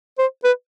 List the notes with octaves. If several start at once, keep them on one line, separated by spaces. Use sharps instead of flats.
C5
B4